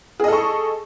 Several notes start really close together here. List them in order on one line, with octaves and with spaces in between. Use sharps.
G#4 D#5 A4 C#6